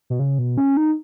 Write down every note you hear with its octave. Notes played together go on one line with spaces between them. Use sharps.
B2
C#3
B2
C#4
D#4